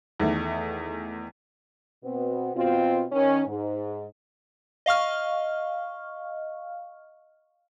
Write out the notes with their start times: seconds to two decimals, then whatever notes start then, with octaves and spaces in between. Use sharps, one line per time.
0.20 E2 D#3 A3
2.04 B2 B3 C4
2.55 B2 C4 F4
3.12 D#3 C#4
3.47 G#2
4.86 D#5 F5 C#6 F6